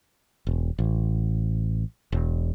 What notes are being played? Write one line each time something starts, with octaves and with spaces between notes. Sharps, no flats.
E1
A1
E1